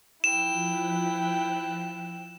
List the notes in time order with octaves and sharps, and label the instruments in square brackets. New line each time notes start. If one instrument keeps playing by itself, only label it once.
[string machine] F3 F#6 [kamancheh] E4 G5 [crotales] E7